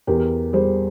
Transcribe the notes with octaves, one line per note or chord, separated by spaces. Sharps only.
E2 G4 A#4
G3 G#4 C5